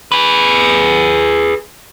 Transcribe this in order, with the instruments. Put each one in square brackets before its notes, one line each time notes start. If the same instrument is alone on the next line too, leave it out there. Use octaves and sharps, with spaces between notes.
[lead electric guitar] G#4 B4